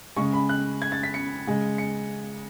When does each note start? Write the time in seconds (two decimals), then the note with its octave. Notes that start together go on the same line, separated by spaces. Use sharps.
0.17 C#3 G#3 C#6
0.33 B5
0.49 F#6
0.82 G#6
0.92 A6
1.03 B6
1.14 C#7
1.47 C#3 G#3
1.78 C#7